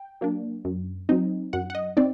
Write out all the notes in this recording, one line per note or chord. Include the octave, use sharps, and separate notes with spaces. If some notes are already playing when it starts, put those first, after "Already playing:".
Already playing: G5
F#3 A#3 D4
F#2
F#3 C4 D#4
F#2 F#5
F#5
D#5
C4 D#4 D5